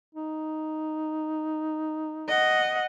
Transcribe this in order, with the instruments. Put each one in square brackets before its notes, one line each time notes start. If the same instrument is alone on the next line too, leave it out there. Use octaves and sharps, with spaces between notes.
[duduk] D#4
[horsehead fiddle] D#5 F#5